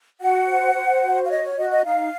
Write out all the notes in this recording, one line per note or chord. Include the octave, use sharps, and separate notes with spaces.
F#4 F#5
C5
C5
F#4
F5
C#5 D#5
C#5
F#4 D#5
D#5
D#4 F5